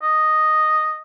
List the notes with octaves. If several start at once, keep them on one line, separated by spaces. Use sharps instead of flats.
D#5